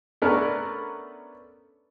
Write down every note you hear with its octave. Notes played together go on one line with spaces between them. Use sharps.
A3 B3 C#4 D4 A#4 B4